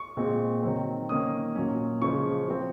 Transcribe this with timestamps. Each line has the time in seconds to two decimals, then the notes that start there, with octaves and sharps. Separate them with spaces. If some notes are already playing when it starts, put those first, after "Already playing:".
Already playing: C#6
0.17 A#2 G#3 C4
0.63 D#3 F#3 C4
1.09 D#3 A#3 C#4 D#6
1.55 A#2 F#3 C#4
2.02 C#3 F3 G#3 C#6
2.48 F3 C4